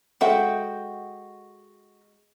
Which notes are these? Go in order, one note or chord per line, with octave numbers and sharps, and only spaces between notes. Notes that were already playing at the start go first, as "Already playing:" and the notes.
G#3 F#4 A4 E5 G5